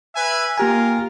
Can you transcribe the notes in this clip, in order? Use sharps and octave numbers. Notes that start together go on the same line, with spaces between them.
B4 E5 G#5
A#3 F4 G4 A#4 G#5